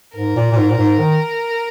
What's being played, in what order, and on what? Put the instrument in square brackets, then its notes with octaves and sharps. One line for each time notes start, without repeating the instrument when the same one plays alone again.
[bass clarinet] G#2 [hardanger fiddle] A#4
[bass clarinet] A#2
A#2
G#2
A#2
G#2
D#3